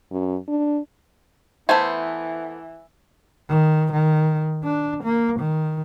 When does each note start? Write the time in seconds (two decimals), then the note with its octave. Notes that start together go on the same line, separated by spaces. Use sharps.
0.11 F#2
0.48 D4
1.69 E3 A3 B3 A4 C5 G#5
3.50 D#3
3.93 D#3
4.64 D4
5.04 A#3
5.40 D#3